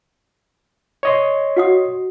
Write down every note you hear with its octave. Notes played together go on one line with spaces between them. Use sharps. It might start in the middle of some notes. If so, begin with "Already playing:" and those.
C#5 D#5 C6
F#4 F#5 D#6